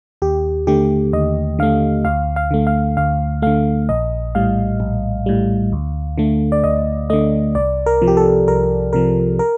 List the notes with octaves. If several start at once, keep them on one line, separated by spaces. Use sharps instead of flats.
D#2 G4
D3 A3 G4
D#2 D#5
D3 A3 F5
D2 F5
F5
D3 A3
F5
D2 F5
D3 A3 F5
A#1 D#5
A2 G3 F5
A#1
A2 G3
D2
D3 A3
D5
D2 D#5
D3 A3 D#5
C2 D5
A#4
C3 F3
G4
A4
C2 A#4
C3 F3 A#4
A#4